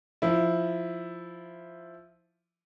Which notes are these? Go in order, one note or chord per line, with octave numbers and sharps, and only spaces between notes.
F3 E4